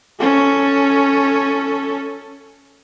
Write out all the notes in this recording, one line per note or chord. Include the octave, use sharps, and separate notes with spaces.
C#4 A4